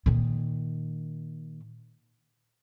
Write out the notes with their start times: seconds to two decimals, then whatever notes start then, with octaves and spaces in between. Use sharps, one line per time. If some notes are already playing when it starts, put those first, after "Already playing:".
0.06 A#2 D#3